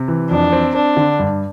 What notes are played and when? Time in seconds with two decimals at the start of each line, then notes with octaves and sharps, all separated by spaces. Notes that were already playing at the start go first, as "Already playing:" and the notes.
Already playing: C3
0.08 E3
0.30 F2 D4
0.52 C4
0.75 C4 D4
0.97 D3
1.19 G2